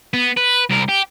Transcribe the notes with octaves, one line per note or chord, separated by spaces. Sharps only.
B3
B4
C2 A#4
G4